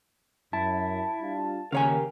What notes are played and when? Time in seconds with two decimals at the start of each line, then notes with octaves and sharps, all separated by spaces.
0.53 F#2 E4 A5
1.21 G3 D4 F4
1.72 D#2 C#3 G4 A#4 C#5 F5 G#5